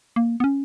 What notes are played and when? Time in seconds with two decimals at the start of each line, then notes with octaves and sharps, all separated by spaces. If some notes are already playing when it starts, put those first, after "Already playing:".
0.16 A#3
0.40 B3
0.44 C#4